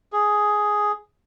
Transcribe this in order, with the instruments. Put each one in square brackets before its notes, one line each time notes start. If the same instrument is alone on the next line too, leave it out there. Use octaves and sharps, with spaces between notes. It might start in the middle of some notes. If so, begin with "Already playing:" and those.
[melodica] G#4